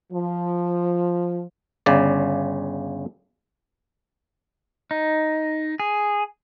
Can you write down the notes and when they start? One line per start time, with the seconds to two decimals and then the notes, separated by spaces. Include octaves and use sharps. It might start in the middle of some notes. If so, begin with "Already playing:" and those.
0.12 F3
1.86 G1 C#3 D5
4.91 D#4
5.80 G#4